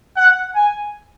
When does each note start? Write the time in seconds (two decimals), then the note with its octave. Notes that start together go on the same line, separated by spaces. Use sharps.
0.17 F#5
0.55 G#5